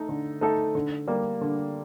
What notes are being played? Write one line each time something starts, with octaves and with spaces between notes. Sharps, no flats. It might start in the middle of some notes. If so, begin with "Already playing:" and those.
Already playing: A3 D#4 A4
D3
A3 D#4 A4
D3
G3 A#3
D3